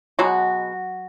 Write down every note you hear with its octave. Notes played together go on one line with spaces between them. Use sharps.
B2 F#3 G#3 B3 F#4